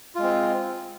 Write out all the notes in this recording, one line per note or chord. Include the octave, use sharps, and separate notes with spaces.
G#3 C4 F4